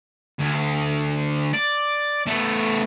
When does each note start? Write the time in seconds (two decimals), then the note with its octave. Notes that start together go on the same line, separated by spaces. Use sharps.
0.39 D2
1.53 D5
2.27 A3 B3